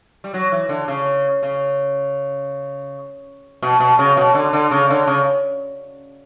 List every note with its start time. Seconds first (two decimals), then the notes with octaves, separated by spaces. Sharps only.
0.24 G3
0.34 F#3
0.52 E3
0.69 D3
0.88 C#3
1.43 C#3
3.62 B2
3.80 B2
3.99 C#3
4.17 B2
4.35 D3
4.53 D3
4.71 C#3
4.90 D3
5.07 C#3